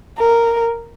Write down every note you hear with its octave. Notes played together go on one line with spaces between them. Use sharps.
A#4